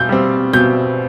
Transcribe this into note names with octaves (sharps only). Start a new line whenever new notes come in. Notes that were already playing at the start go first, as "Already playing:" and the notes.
Already playing: B2 G6
G3 C4
B2 G6